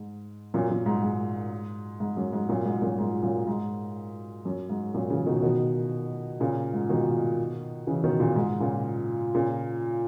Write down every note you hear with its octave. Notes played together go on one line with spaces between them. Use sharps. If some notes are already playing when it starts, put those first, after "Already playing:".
Already playing: G#2
F#2 A#2
F#2 A#2
G#2
G#2
G#2
F#2
G#2
F#2 A#2
G#2
F#2 A#2
G#2
F#2 A#2
G#2
F#2
G#2
F#2 A#2
C#3 E3
B2 D#3
B2 D#3
A#2 C#3
G#2
B2 D#3
C#3 E3
B2 D#3
A#2 C#3
G#2
A#2 C#3
A#2 C#3